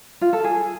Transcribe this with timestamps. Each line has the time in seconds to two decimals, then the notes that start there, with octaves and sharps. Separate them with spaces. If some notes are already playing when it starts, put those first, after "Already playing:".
0.21 F4
0.33 A4
0.44 G#4